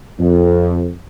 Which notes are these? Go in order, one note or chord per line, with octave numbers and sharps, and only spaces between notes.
F2